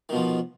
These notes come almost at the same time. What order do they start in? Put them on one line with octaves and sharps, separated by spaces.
D#3 B2 F3